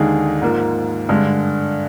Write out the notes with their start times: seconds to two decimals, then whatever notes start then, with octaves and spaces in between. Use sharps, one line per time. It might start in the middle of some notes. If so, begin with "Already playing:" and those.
Already playing: D#2 D3 G#3 D#4 G#4
0.42 G#2 F3 A#3
1.09 G2 D3 G#3